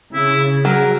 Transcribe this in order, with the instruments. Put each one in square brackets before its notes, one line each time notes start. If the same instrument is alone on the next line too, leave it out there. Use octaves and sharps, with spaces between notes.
[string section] C#3 [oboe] E4
[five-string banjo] F#3 [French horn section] F#4 G#4 [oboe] A#4